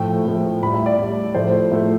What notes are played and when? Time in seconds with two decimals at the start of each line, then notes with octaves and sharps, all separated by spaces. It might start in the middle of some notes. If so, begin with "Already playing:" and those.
Already playing: A2 F3 A3 G5
0.25 A2 F3 A3
0.62 A2 B5
0.65 G3
0.74 E5
0.86 D5
0.98 A2 G3
1.35 A2 F3 A3 C5
1.71 A2 F3 A3